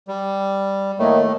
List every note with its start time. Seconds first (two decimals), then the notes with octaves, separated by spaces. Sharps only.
0.08 G3
0.99 A2 D#3 A3 A#3